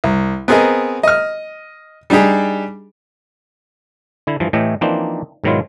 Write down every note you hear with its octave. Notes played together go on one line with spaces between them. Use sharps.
C2
B3 C4 G#4 A#4 D#5
D#5 F6
G3 D4 D#4 G4 G#4
D3 E4
G2 E3 F3
A2 E3 A3 G4 D#5
E3 F3 A#3 C4 D4 D#4
G#2 B2 D#3 F#3 E4 F4